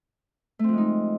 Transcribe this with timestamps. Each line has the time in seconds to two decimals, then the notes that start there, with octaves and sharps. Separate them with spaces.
0.59 A3
0.64 C4
0.68 F3
0.73 G#3
0.78 D#4